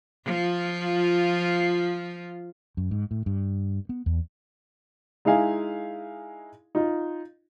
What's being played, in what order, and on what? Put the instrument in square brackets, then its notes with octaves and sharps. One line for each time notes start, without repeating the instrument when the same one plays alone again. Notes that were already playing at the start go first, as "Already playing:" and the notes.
[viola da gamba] F3 F4
[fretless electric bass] F#2
G#2
A2
G2
B3
E2
[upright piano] G#3 D#4 E4 F5 G#5
D#4 F4